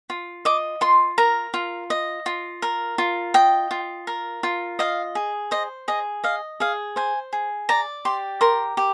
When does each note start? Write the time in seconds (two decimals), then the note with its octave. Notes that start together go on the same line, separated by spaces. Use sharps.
0.10 F4
0.45 D#5 D6
0.81 F4 C6
1.18 A#4 A#5
1.54 F4
1.90 D#5
2.26 F4
2.62 A#4
2.98 F4
3.34 D#5 G5
3.71 F4
4.07 A#4
4.43 F4
4.79 D#5 F5
5.15 G#4
5.51 C5 D#5
5.88 G#4 D#5
6.24 D#5 F5
6.60 G#4 F5
6.96 C5 G#5
7.33 G#4
7.69 D5 A#5
8.05 G4 C6
8.41 A#4 C6
8.77 G4